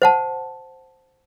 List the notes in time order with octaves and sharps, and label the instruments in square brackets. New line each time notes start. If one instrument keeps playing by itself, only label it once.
[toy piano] C5 F#5 A5